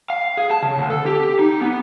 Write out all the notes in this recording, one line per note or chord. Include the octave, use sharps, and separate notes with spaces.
F5
G#4
A5
C#3
D2
A4
G4
D#4
B3